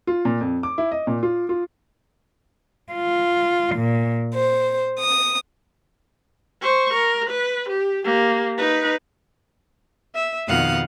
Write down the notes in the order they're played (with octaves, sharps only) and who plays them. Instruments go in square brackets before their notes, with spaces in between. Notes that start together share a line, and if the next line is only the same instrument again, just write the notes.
[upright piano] F4
A#2
F2
D6
E4
D#5
A#2
F4
F4
[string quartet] F4
A#2
C5
D#6
[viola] C5 C#6
A#4
B4
G4
A#3 G4
D#4 B4
[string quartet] E5
F2 B2 D#3 F5 F#5 D#6